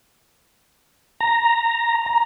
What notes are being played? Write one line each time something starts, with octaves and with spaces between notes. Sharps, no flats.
A#5
A#5